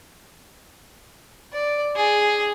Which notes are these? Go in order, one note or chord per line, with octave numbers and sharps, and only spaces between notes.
D5
G#4